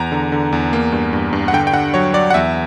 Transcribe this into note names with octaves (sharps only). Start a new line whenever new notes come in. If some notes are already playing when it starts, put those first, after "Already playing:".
Already playing: E2 A#5
D3
D3
E2
A#3
G2
G2
G2
F#5
D3 G5
G5
D3 F#5
F#3 C#5
F#3 D5
F#5
E2 E5